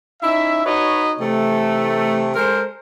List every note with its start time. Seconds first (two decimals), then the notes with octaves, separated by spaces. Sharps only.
0.22 C#4 D#4 E4 E5
0.66 D#4 F#4 B4 C#5 D#5
1.18 C3 E3 A3
2.35 G#3 A4 A#4 C5